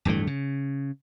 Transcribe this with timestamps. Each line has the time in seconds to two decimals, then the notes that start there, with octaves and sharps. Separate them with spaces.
0.05 D1 G2 E3 A3
0.27 C#3